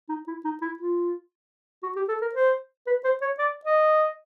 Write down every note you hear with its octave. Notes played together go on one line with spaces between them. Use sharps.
D#4
E4
D#4
E4
F4
F#4
G4
A4
A#4
C5
B4
C5
C#5
D5
D#5